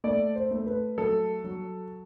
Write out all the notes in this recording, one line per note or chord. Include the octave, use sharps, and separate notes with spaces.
A3 D5
C5
A3
B4
F#3 A4
F#3